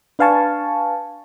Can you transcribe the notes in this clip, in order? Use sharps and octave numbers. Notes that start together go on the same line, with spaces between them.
D4 B4 F5 G#5 A5 C#6